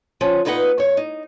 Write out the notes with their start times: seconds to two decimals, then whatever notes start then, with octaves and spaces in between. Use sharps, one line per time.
0.21 F3 C#4
0.45 A#2 B3 D#4 B4 D#5 F#5
0.78 E2 C#5
0.97 D#4